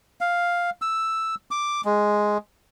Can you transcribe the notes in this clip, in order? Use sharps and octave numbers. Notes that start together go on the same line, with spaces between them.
F5
E6
D6
G#3